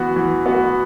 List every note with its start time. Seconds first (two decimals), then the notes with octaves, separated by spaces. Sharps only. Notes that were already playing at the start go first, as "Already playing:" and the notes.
Already playing: E3 B3 F#4
0.16 E3
0.46 B3 F#4